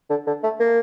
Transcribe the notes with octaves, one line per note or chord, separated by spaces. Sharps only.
D3
D3
A3
A#3